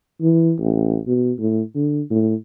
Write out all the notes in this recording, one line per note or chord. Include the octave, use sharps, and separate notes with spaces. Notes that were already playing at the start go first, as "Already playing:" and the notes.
E3
A1
B2
A2
D3
A2